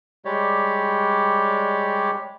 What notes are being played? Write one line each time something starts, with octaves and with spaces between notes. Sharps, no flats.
G3 G#3 G4 C#5 D5